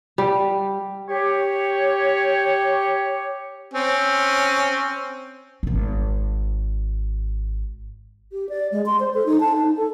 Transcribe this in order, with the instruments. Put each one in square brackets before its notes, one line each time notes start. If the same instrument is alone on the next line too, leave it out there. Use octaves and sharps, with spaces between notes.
[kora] G3
[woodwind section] G4 C#5
[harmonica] C4 C#4
[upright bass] D#1 G#1
[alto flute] G4
D5
G#3
C6
C5
A4
D#4
A5
D#4
A4